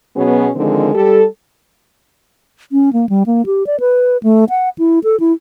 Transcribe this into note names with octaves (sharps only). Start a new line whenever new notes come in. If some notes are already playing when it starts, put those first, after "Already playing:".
B2 F#3 B3 C#4 G#4
D3 D#3 F3 G#3 C4
G3 G4 A4
C#4
A#3
G3
A#3
G4
D5
B4
A3
F#5
E4
A4
E4